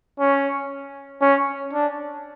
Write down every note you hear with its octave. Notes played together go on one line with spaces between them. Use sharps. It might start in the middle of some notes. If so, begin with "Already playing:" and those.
C#4
C#4
D4